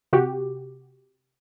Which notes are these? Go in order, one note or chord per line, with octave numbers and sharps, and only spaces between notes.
C3 F#4 G4